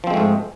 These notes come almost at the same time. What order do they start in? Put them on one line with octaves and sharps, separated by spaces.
F3 C4 G#3 A3 G#2